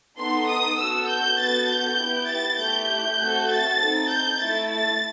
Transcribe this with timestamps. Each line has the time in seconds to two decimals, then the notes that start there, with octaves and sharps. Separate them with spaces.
0.18 B3 D#4 A4 C6
0.49 D#6
0.78 B3 F#4 A4 E6
1.09 G6
1.39 B3 F#4 A4 A6
1.69 G6
1.99 B3 E4 G4
2.29 A6
2.59 A3 E4 G4 G6
3.19 A3 C4 F#4 A4
3.50 A6
3.79 C4 D#4 A4
4.09 G6
4.39 A3 E4 A4 A6
4.69 A6